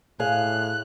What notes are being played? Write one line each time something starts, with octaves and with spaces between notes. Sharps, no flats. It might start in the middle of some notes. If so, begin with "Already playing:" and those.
A2 G#4 F5 F#6